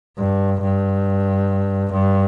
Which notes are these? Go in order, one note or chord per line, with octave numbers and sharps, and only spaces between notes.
G2
G2
G2